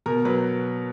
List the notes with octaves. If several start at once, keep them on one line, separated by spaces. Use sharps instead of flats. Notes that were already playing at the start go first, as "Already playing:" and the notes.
B2 A#4
F#3 B4